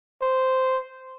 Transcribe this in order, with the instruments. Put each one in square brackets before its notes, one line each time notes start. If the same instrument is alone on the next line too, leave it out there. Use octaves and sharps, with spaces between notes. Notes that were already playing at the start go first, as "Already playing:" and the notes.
[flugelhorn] C5